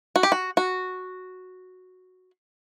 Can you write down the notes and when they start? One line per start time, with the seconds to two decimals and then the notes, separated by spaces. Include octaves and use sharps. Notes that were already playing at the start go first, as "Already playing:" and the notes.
0.16 F#4
0.23 G4
0.32 F#4
0.57 F#4